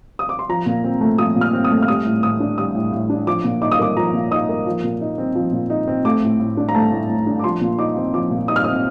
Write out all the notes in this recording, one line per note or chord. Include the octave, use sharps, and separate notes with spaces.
D#6
D6
C6
F3 A#5
A#2
C4
A3
F3 D#6
A#2
F6
C4
D#6
A3
F6
G3 D#6
A2
A2 D#6
D4
G3 D#6
A2
A2
D4
F3 D6
A#2
D#4 D6
D#6
A#3 D6
F3 A#5
A#2
D#4 D#6
A#3
F3
A#2
D#4
C4
F3
A#2
D#4
C4
A3 D6
A2
A2
D4
A#5
A3 A5
A2
A2
D4
D6
F3 C6
A#2
D#4 D6
C4
F3 D6
A#2
D#4 D#6
F6
C4 D#6